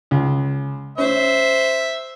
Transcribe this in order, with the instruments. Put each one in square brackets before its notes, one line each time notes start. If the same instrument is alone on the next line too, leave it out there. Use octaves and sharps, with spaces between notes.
[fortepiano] C#2
[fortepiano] C#4 [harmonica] C5 E5